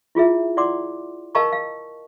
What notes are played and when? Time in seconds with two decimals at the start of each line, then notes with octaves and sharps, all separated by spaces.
0.15 E4 F4 G#4 E5
0.57 E4 D5 F#5 C6 D6
1.35 A#4 D#5 F5 A5 A#5 C#6
1.52 F5